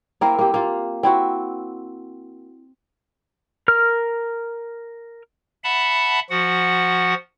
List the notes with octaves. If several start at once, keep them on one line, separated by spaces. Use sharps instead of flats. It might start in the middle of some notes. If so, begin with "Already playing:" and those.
A#3 C4 E4 A#4
A#3 G4
A#3 F4
C4 E4 F#4
A#4 F6
E5 F#5 A5 B5
F3 F#4 F#5